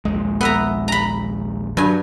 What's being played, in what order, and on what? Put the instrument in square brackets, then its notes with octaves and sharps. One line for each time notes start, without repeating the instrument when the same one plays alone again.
[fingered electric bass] A#1 D#2 G#3
[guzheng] B3 E5 A#5
A#5 B5
[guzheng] G2 G#5 [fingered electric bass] F#3